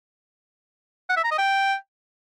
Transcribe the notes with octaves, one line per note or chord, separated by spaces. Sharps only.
F#5
E5
A#5
D#5
G5